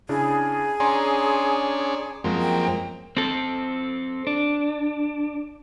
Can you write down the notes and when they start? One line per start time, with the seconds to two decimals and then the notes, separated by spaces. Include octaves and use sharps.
0.09 C#3 D4 E4 G#4
0.80 C#4 D4 G#5 A#5 C6
2.24 F#2 F3 G#3 A#3 C4
2.41 G5
3.17 C4 A4
4.27 D4